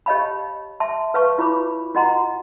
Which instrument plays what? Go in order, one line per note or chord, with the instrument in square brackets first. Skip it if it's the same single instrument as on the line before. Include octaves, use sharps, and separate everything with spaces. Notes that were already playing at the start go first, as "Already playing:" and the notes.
[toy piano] G4 C#5 D#5 F5 A5 B5
E5 A5 C6
B4 C#5 F5 A5 C#6
E4 F4 C#5 B5 D6
F4 F#4 D#5 F#5 A#5 C6